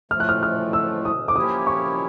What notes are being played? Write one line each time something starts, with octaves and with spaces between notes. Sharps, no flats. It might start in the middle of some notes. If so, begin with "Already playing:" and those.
A2 F3 A3 F6
F#6
F6
F6
E6
D#6
D6
F3 A#3 C#4 E4 G4 D#6
C#6